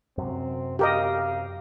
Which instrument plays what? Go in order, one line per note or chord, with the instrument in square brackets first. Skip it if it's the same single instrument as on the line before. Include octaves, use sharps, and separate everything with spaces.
[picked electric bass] F#2 C3 [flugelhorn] C4
[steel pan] G4 A#4 D#5 [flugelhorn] F5